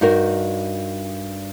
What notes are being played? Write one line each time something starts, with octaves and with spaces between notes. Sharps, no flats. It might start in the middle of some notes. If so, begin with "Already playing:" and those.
G2 D#4 F#4 A#4